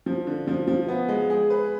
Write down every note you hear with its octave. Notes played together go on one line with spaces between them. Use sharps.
F3
D3
F3
F3
B3
G#3
G#4
B4